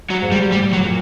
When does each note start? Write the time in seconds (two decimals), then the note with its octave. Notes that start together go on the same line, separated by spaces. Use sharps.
0.10 F#3
0.22 G#2
0.32 G3
0.52 A2 G3
0.73 F#3
0.83 A#2